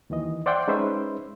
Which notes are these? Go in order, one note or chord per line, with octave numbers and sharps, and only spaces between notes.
D#2 D#3 E3 D#5
C5 D5 E5 F#5 G5 C6
G#3 C#4 D#4 B4 C5 E5